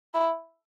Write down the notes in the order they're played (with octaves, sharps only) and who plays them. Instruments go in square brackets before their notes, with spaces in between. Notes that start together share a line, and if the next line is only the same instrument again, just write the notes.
[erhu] E4